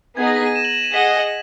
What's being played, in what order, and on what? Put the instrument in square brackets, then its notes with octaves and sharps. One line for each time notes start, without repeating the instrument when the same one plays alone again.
[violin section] B3 D#4 G#4 [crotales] G#6
[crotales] A#6
B6
D#7
E7
F#7
E7
D#7
[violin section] G#4 D#5 F#5 [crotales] B6